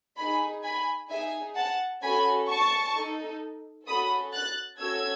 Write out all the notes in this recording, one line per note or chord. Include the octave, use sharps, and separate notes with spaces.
D#4 G#4 G#5 B5
G#5 B5
D#4 G#4 E5 G#5
F#5 A5
C#4 F#4 A4 G#5 B5
A5 C#6
D#4 A4
C#4 F#4 A4 B5 D#6
F#6 A6
C#4 F#4 A4 E6 G#6